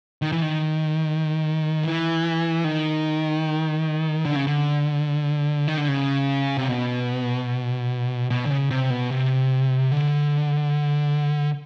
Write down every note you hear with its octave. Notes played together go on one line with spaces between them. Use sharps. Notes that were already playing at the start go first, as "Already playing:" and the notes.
D#3
E3
D#3
E3
D#3
D3
C#3
D3
D#3
D3
C#3
C3
B2
B2
D3
C#3
C3
B2
C3
D3